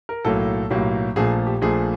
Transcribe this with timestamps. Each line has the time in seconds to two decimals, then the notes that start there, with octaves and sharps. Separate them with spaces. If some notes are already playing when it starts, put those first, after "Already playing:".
0.09 A#4
0.24 B1 A2 F#3 A#3 A4
0.70 B1 A2 F#3 A#3 G4
1.16 A#1 A#2 F3 A3 G#4
1.47 G4
1.61 A#1 A#2 F3 A3 G#4